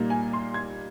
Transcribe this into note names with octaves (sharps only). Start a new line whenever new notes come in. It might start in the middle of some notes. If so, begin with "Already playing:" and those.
Already playing: A#2 G3 A#3 D#4
G#5
C6
G#6